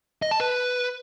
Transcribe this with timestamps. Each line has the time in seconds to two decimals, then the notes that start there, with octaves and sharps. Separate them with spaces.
0.22 D#5
0.31 A5
0.40 B4